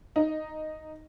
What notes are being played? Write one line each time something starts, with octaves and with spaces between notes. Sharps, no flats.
D#4